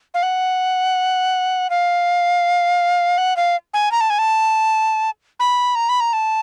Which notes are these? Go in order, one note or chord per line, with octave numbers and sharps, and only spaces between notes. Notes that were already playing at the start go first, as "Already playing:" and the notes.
F5
F#5
F5
F#5
F5
G#5
A#5
A5
G#5
A5
B5
A#5
B5
A#5
A5